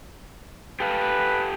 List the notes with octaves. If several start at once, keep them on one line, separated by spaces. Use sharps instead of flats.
G4 A4 B4 F5